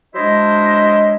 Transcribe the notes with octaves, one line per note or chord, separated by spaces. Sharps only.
F#3 G#3 D4 E4 C5 D#5